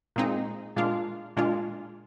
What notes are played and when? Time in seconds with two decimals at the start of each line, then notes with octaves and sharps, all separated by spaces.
0.16 A#2 G#3 C4 D#4
0.76 A#2 G#3 D4 F4
1.37 A#2 G#3 D4 F4